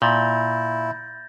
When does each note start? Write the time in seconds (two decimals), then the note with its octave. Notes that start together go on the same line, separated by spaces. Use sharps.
0.02 A#2 E4 G6 A6 A#6